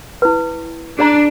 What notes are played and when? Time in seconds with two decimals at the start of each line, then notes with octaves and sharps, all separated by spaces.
0.22 E4 B4
0.99 D4 G#4 D5 A#5